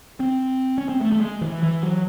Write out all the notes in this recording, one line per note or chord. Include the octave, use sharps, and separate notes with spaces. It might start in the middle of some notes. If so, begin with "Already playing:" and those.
C4
C#4
C4
A3
A3
G#3
E3
E3
F#3